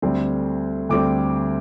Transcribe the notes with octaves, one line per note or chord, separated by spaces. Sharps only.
D2 D3 G3 C4
D2 D3 G3 C4 D6